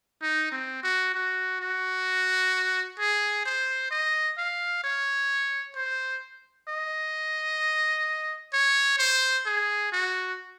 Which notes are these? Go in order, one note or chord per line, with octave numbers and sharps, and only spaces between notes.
D#4
C4
F#4
F#4
F#4
G#4
C5
D#5
F5
C#5
C5
D#5
C#5
C5
G#4
F#4